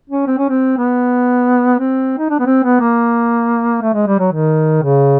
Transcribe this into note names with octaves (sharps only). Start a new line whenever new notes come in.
C#4
C4
C#4
C4
B3
C4
D#4
D4
B3
C4
B3
A#3
A3
G#3
G3
F#3
D#3
C#3